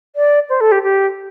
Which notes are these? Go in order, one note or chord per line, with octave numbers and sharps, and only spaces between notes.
D5
C5
A4
G4
G4